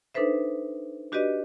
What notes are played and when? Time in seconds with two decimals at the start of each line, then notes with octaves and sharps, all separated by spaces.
0.15 D4 D#4 A4 B4 C5 E5
1.12 D4 F#4 G4 B4 D5 D#5